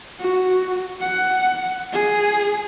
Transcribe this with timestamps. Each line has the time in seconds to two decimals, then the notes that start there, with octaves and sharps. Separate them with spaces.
0.19 F#4
1.01 F#5
1.92 G#4